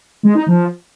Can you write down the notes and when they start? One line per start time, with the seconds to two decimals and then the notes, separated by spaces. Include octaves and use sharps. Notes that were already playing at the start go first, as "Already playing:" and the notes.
0.23 G#3
0.35 D#4
0.47 F3